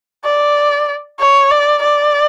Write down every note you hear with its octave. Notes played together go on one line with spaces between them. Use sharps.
D5
C#5
D5
D5